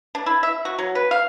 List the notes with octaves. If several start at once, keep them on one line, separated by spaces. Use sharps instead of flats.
D4
E4
E5
F#4
F#3
B4
F5